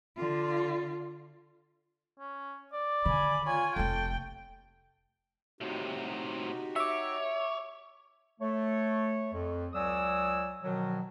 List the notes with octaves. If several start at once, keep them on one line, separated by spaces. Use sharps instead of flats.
D3 F4
C#4
D5
D3 D#3 G#5 B5
F4 C#5 G#5
F1 A#3 A4 G5
A2 C3 D#4 F#4 G4
C#5 E5 D6
A3 C#5
F2
C#2 F#3 D5 G#5 D#6 E6
B2 D#3 F3 F#3